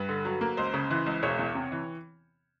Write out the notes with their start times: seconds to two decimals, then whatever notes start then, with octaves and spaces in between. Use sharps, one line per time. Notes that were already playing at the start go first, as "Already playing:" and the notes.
Already playing: G2 B4
0.09 D3
0.25 F#3
0.41 A#3
0.57 C#2 C5
0.74 C#3
0.90 E3
1.06 C#2
1.23 E1 C#5
1.39 E2
1.55 C3
1.72 E3